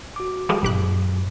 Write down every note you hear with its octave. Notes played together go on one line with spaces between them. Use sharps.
F#4 D6
F3 G3 G#3
G1 F#2 A#2 F#3 G4 F#6